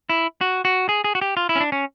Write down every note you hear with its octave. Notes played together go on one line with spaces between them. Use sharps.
E4
F#4
F#4
G#4
G#4
F#4
G4
F4
E4
C#4
D4
C#4